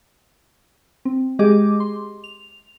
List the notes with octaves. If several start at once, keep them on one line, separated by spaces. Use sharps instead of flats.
C4
G#3 G4 G#4 D#5 D6
C6
F7